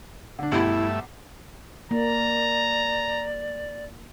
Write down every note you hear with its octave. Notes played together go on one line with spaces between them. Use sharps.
D3 D4
B1 G2 A3 E4 G4 E5 E6
A#3 D5 A#5